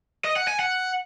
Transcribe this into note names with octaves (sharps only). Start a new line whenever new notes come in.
D#5
F#5
G#5
F#5